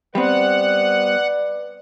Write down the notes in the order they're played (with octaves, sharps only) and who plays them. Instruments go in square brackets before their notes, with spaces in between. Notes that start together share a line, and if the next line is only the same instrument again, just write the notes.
[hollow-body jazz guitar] G3 B3 C4 [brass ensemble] B4 D5 [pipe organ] F#5